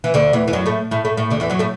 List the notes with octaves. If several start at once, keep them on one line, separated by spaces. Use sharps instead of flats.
E3
D2 D3
E2 E3
E3
F#2 F#3
A2 A3
A2 A3
A2 A3
A2 A3
D2 D3
E2 E3
F#2 F#3
A2 A3